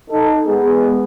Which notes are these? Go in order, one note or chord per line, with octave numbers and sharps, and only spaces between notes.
D#4 A4
G#3 B3 G#4